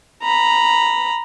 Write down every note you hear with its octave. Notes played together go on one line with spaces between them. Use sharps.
A#5 B5